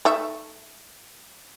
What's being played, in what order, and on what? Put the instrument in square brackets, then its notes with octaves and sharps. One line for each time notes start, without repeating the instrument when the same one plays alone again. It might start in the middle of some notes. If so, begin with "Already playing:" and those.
[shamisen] A3 D#4 E5